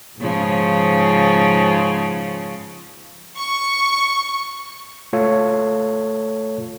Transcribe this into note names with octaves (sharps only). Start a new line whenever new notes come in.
G#2 C#3 F3
C#6
A3 F4 A4 C#5 F5